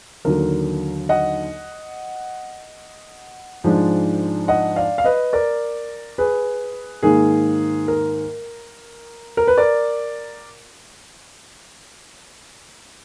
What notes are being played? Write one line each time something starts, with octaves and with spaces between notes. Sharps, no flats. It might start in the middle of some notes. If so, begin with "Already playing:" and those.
D#2 D3 F#3 A#4
D#5 F#5
G#2 F3 G#3 D4
D#5 F#5
D5 F5
F5
B4 D#5
A#4 D5
G#4 B4
G#2 D#3 A#3 G#4
A#4
A#4
B4
A#4 D5